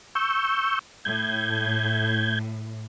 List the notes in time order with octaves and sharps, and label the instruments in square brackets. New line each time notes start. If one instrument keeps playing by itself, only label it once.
[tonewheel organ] C#6 E6 G6
[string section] A2 [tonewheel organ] G6 G#6